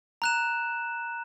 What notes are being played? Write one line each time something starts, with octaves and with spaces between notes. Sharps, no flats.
A#5 F#6 E7